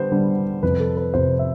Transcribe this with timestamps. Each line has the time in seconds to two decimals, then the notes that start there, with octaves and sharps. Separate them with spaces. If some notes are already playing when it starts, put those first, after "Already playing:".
Already playing: D3 G3 B3 C5
0.12 D3 G3 B3
0.63 F2 C3 F3 B4
0.80 A4
0.97 B4
1.14 F2 C3 F3 C5
1.39 E5